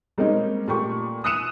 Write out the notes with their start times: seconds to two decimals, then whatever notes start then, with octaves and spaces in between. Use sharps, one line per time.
0.18 G3 G#3 A#3 C4 C#4 D#4
0.68 A#2 A3 G4 C#6
1.24 D#6 E6 F#6 C#7 D#7 E7